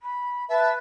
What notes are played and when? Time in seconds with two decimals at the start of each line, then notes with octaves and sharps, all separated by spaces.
0.02 B5
0.49 B4 E5 A5